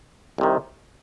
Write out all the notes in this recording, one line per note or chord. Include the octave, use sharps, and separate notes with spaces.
C2 C3 D#3